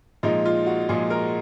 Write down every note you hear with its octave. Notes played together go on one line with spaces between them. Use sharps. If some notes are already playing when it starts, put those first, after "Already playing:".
A#2 F3 G#3 D#4
F4
F#4
A#2 F3 G#3 G#4
A#4